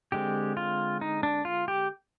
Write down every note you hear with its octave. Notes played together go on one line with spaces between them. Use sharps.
D3 G#3 C4 G4
F4
D#4
D4
F4
G4